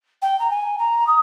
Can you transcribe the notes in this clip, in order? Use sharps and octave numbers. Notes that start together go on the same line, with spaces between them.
G5
A#5
G#5
A#5
D#6